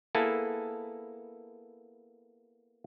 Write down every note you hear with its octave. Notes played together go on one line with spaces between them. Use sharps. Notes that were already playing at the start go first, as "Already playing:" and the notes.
A#3 B3 E4 G#4 A4 A5